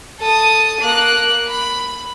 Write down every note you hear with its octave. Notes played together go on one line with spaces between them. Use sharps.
A4 D#6
A#3 F#6
B5